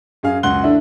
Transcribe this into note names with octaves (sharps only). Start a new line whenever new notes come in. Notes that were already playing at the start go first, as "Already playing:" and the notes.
F#2 G#4 F5
C#2 F#2 F#5 C6 F#6 G7
D3 A3 D4 E4